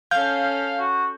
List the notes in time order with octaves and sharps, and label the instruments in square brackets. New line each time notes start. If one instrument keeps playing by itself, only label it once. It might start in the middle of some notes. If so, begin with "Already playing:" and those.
[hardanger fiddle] C#4 A4 [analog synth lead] F5 [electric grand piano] G6
[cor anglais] F#4